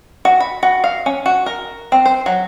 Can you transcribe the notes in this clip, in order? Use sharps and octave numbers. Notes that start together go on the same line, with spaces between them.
F#4
B5
F#4
F5
C#4
F#4
A#4
C4
C5
F#3